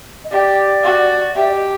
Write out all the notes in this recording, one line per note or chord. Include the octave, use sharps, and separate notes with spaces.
D#5
G4 D5
F#4
G4 E5
D5
D#5